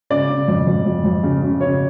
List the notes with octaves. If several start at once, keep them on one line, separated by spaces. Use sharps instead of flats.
C#3 D5
C#3
F2
F2
F2
F2
C#3
C#3
C#3 C#5